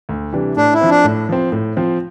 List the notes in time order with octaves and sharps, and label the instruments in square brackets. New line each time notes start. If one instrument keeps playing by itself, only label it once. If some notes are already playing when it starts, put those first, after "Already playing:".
[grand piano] D2
C3 E3 G3 D4
[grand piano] A2 [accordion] D4
[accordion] E4
[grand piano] F3 C4
[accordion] D4
[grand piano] A2
F3 C4
A2
F3 C4